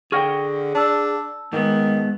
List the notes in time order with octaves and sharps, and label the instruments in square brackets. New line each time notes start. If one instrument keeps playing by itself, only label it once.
[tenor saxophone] D3 [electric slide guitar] G#4 F#5 G5 [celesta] C#6 F6 A#6
[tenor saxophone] D4 [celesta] A5 E6
[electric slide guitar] G#2 B3 [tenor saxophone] D#3 [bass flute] G#3